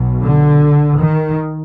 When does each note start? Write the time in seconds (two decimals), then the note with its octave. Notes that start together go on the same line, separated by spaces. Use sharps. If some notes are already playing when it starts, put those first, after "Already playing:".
Already playing: B1 B2
0.23 D3
0.99 D#3